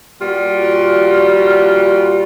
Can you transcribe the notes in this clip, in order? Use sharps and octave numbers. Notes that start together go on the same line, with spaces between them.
A#2 G3 F4 F#4